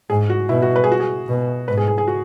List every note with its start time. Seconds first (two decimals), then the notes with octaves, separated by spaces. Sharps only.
0.10 G#2 G#4
0.30 F#4
0.49 B2 E4
0.62 F#4
0.76 B4
0.84 G#4
0.92 F#4
1.00 G#4
1.28 B2
1.68 G#2 B4
1.78 G#4
1.88 G#4
1.98 G#4
2.07 F#4